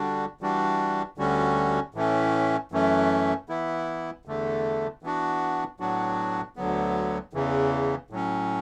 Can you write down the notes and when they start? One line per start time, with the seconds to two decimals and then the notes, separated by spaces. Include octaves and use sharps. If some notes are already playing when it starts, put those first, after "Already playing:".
Already playing: D3 G3 D4 F#4
0.41 E3 G3 D4 F#4
1.18 D2 D3 G3 C#4 F#4
1.94 A2 E3 A3 C#4
2.72 F#2 E3 A3 C#4
3.49 E3 B3 E4
4.25 E2 D3 A3
5.02 E3 B3 D4 F#4
5.80 A2 F#3 B3 D4 F#4
6.56 D2 D3 F#3 B3
7.33 E2 C#3 E3
8.10 A2 F#3 C#4